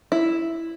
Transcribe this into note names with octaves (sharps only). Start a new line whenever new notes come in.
E4